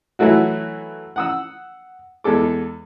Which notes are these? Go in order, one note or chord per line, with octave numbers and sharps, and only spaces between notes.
E3 F#3 A3 E4 F#4
F#5 D#6 E6
E2 G#3 A4 D6